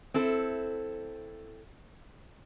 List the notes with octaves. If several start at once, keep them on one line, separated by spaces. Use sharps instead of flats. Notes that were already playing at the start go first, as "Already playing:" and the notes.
C4 E4 A4